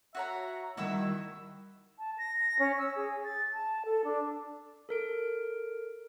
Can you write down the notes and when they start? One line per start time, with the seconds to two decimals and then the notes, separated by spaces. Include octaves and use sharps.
0.15 F#4 C#5 E5 A#5
0.77 D#3 G3 E4 F#4 E5 E6
1.99 A5
2.18 A#6
2.59 C#4
2.79 E6
2.96 G#4
3.24 A6
3.53 A5
3.85 A4
4.05 D4
4.89 A4 A#4 D7